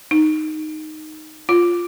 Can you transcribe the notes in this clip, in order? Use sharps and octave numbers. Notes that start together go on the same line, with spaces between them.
D#4
F4